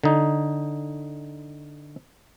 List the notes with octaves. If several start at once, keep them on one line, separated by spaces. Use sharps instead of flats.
D3 D#4